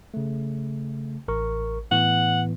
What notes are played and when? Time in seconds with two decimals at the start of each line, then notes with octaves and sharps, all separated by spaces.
0.14 C#3 A3
1.28 A1 A#4 C#6
1.91 A2 E3 B3 F#5